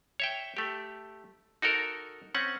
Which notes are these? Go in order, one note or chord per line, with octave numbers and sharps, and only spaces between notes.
C#5 E5 G5
A3 G4
D#4 F#4 A4 A#4
C4 C#4 F#5